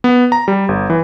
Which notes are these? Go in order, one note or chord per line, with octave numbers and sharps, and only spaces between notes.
B3
A#5
G3
G1
E3